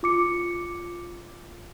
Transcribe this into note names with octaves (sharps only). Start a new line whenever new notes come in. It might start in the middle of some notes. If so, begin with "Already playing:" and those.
F4 D6 C#7